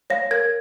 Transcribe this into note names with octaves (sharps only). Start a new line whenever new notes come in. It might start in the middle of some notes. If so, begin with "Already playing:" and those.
C#5 F5 A#6
A#4 G#6